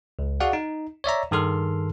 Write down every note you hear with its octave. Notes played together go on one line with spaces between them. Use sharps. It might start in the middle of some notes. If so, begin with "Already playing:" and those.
C#2
F#4 G#4 D5 F5 F#5
D#4
C#5 D5 E5 A#5
G2 D#3 G#4 A4 C6 F6